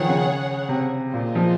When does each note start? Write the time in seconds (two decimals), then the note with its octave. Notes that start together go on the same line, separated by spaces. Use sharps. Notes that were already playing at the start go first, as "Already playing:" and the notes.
Already playing: D#3 F3 G#4 C#5 F#5
0.08 C#3
0.69 C3
1.13 A#2 F4 G#4 C5 D#5
1.35 F3